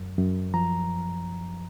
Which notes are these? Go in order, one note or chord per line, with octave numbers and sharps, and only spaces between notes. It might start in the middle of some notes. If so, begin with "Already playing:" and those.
Already playing: F#2
F#2
F3 A#5